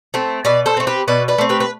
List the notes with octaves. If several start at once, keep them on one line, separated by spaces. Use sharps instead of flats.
A3 C4
B2 B4 D5
A4 C5
A3 C4
G4 B4
B2 B4 D5
B4 D5
A3 C4
G4 B4
B4